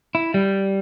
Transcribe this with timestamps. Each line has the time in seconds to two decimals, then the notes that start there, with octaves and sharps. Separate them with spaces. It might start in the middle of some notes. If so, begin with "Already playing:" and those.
0.15 E4
0.34 G3